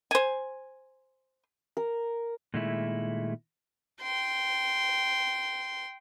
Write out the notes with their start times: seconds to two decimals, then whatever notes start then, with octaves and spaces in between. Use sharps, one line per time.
0.11 C5 G#5
1.77 A#4
2.54 A#2 D#3 G#3 A3 E4
4.02 G5 C6